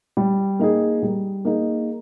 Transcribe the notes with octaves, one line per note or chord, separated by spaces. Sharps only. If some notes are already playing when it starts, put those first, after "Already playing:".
G3
A#3 D#4 G#4
G3
A#3 D#4 G#4